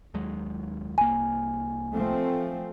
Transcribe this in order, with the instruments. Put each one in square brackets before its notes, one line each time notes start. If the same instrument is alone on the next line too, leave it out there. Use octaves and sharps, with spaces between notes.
[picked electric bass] D#2 F#3 G#3
[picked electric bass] C2 A#3 [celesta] G#5
[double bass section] F3 A3 C4